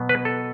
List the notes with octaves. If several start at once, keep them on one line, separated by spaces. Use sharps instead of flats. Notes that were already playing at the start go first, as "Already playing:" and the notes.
Already playing: B2 F#3 B3
B4
A4